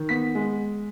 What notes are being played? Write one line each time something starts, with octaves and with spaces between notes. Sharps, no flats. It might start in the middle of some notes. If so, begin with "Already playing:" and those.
Already playing: D#3
B3 B6
G#3